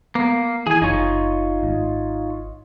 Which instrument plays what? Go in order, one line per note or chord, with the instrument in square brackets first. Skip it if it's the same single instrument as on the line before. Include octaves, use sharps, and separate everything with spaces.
[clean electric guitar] A#3 [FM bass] B3
[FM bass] E3 [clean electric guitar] G#4 G#5
[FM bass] F#1 [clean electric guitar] D#4 F4 C#5
[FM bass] G#1